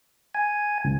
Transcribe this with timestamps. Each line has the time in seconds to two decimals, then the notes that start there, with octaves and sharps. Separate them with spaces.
0.35 G#5
0.85 C#2